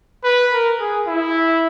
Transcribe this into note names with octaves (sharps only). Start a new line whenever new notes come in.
B4
A#4
G#4
E4